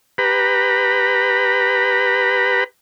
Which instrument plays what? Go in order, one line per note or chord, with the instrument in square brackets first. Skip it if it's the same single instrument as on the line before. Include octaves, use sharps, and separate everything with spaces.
[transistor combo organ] G4 B4 A#5 B5